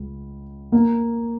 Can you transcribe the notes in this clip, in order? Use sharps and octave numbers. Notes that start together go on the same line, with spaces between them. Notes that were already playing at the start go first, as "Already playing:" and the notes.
Already playing: C#2
A#3